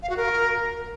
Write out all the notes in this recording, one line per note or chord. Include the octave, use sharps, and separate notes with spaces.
F5
F#4
A#4